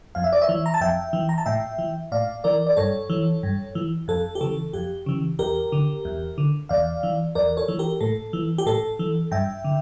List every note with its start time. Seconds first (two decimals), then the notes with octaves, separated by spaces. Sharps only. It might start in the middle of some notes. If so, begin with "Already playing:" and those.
0.15 F2 F5
0.24 E5
0.33 D5
0.42 C#5 E5
0.49 E3
0.66 A#5
0.74 A5
0.81 F2 E5 G5
1.13 E3
1.29 A#5
1.38 A5
1.46 A2 E5 G5
1.78 E3
2.12 A2 D5 F5
2.44 E3 A#4 D5
2.67 D5
2.77 G2 A4 C#5
3.10 E3
3.43 G2
3.75 E3
4.08 F2 A4
4.35 G4
4.41 C#3 E3 A4
4.73 F2 G4
5.06 C#3 E3
5.39 E2 G4 A#4
5.72 D3
6.05 E2
6.38 D3
6.69 E2 D5 F5
7.03 E3
7.35 E2 A#4 D5
7.57 A4 C#5
7.68 E3
7.79 G4 A#4
8.00 A2 A4
8.33 E3
8.58 G4
8.66 A2 A4
8.99 E3
9.31 G2 E5 G5
9.64 D3